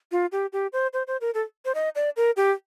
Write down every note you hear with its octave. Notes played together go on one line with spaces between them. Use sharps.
F4
G4
G4
C5
C5
C5
A#4
A4
C5
D#5
D5
A#4
G4